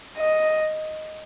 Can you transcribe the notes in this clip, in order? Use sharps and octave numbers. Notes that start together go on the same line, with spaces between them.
D#5